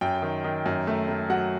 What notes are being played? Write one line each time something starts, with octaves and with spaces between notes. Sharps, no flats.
F#2 G5
D#3
D#3
F#2
A3
A3
F#3 F#5